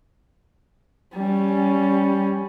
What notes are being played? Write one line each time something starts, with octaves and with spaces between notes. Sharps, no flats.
G3 C#4